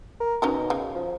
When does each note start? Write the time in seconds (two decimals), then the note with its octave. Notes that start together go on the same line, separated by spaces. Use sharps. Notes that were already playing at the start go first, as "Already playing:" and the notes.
0.20 A#4
0.42 B2 C#4 D#4 A#4
0.70 C#3
0.94 F3